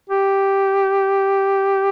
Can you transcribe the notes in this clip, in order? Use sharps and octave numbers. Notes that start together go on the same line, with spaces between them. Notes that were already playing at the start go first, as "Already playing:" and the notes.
G4